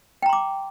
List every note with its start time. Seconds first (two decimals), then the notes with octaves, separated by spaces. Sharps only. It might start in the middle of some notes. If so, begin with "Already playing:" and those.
0.22 G5
0.26 A#5
0.29 C6
0.33 D6